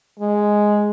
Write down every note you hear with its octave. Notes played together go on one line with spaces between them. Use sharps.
G#3